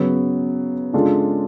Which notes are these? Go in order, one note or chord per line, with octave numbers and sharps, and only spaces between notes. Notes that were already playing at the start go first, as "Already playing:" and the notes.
Already playing: C#3 F#3 B3
C#3 G#3 D4 F4 A4